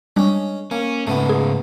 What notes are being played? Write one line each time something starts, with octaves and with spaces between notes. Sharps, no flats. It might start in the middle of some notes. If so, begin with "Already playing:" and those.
G3 G#3 C#4 D4
A#3 C#4
G#2 C#3 A3 B3
G#4